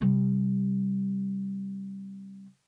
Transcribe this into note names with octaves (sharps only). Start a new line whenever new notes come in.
C3 G3